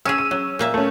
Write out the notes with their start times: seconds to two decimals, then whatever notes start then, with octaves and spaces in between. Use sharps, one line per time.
0.05 C#4 G#4 E6 D#7
0.18 D#7
0.31 F#3 C#4
0.59 A#2 A#3 E5
0.74 A3 C#4